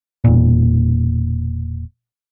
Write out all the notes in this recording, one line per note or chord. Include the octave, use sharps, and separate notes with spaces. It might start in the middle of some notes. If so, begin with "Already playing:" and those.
E1 A#2